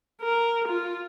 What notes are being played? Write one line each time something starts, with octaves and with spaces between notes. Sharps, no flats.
A#4
F4